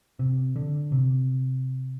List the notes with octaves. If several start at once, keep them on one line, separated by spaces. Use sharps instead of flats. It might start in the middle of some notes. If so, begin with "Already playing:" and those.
C3
D3
C3